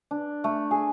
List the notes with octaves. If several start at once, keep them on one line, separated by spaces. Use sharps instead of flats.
D4
A3
G#4